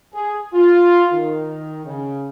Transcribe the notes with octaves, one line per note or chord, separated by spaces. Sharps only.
G#4
F4
D#3
C#3